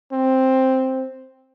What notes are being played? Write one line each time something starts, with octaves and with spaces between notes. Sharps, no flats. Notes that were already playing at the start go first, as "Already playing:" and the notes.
C4